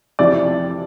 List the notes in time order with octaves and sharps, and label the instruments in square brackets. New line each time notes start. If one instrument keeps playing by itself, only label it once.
[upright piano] F2 C3 E3 D5